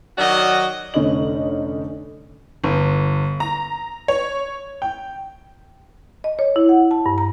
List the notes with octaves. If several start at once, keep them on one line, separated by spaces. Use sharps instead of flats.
D#3 F#3 F#4 D5 D#5
F1 D3 C#4 D#4 D#5 F#7
G1
A#5
C#5
G5
D#5
C#5
E4
F#5
A5
G2
A#5